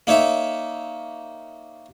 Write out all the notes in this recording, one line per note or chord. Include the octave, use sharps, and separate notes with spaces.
A#3 D#4 C#5 E5